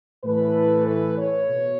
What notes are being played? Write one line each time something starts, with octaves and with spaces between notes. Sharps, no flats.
A2 E3 A3 B4
B4
C#5
B2